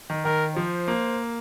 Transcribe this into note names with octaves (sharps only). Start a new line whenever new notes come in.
D#3
D#3 A#4
F3 C5
A#3